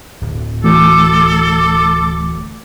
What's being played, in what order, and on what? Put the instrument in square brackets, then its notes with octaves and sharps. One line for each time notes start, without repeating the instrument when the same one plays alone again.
[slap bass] D1
[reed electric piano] E3 A3 F#4 [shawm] A4 [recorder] D6